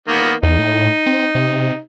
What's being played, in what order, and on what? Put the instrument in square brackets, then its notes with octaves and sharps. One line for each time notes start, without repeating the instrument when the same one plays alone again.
[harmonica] D#3 A#3 B3
[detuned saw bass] E2 [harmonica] D#4
[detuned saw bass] A2
C4
C3